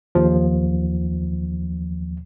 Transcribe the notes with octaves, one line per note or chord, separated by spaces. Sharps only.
D#2 F3